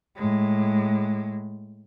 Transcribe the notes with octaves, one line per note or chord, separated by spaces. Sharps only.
A2 G#3